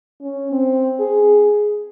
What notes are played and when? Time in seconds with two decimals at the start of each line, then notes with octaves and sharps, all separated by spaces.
0.21 C#4
0.52 C4
1.00 G#4